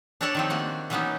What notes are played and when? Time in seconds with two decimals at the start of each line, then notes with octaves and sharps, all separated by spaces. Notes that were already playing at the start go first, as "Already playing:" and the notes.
0.21 D4 G4 A4 C#5 D5 A5
0.35 D#3 F3 C4
0.50 A#3 F#4
0.90 E3 F#3 A#3 B3 C#4 D#4